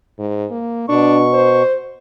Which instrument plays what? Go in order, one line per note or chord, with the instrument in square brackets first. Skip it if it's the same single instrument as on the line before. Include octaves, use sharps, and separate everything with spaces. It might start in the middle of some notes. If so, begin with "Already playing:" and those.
[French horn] G#2
A#3
[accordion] B2 C#6 [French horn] D4
[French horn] C5